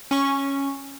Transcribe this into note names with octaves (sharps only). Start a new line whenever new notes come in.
C#4 C#6